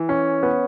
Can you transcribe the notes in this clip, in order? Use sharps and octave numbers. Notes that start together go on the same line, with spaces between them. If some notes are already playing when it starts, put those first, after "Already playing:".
Already playing: E3
C#4
B3